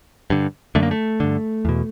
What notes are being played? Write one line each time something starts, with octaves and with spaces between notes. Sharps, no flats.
G2 D3
F#2 D3 A3
A#3
A3
G2 D3
E2 B2